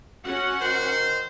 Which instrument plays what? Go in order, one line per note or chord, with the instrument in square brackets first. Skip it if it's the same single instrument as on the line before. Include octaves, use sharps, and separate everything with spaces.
[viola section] C#4 F#4 F#5
[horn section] D#3 A#4 C5